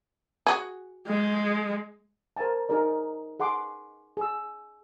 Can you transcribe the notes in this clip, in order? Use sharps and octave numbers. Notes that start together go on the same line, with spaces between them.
F#4 G#4
G#3
A#4 C5 F5 G#5 A5
D#4 G#4 A#4 D5
G#4 F#5 C6 D6
G#4 E6